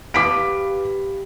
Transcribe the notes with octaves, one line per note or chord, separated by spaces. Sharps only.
G4 B4 F5 D6 B6 D7